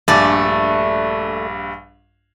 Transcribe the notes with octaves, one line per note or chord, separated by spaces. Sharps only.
A#1 G2 A3 D5 G#5